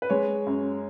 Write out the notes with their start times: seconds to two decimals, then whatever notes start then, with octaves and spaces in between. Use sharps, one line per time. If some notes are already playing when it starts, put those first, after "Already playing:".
0.02 B4
0.10 G#3 C#5
0.46 F#2